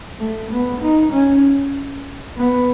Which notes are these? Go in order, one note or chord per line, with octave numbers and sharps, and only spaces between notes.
A3
B3
D#4
C#4
B3